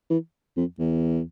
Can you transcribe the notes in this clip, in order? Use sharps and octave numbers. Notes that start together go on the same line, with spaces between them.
E3
F2
E2